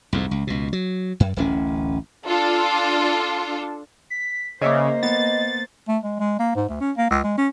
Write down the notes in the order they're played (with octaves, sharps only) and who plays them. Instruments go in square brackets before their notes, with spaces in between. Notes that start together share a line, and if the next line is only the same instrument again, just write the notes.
[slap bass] C2 F2 G#2
C#2
C#2 B2
F#3
F#2
D1 A1 C#4
[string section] D4 F4 A4
[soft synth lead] B6
[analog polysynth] C#3 [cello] A#3 C5 [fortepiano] C#5 E5 D6 [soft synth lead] D#5
[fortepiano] B3 [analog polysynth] A6
[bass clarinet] A3
G#3
G#3
A#3
G#2
D2
C#4
A#3
C#2
G#3
C#4